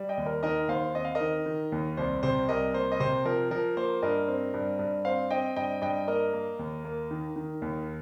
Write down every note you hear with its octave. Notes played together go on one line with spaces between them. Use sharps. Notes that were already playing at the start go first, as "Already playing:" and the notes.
Already playing: G3
D#5 G5
D#2
A#4
D#3 A#4 D#5
D#2 C5 F5
C4 D#5
F5
A#4 D#5
D#3
D#3
D#2
C2 C5
C3 C5
C2 A#4 D#5
A#3 C5
D#5
C3 C5
F3 A#4
F3 A#4
A#3 C5
G2 A#4 D#5
C4
G2
G2
C4 C5 F5
C4 D#5 G5
G2 D#5 G5
G2 D#5 G5
A#3 A#4 D#5
A#3
D#2
A#3
D#3
D#3
D#2